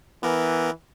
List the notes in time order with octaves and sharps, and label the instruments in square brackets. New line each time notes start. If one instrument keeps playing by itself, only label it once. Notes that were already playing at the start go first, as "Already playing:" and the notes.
[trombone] E3 [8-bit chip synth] B3 A#4